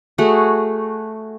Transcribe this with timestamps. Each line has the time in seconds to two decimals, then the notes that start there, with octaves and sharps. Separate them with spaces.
0.18 A3 F#4 G#4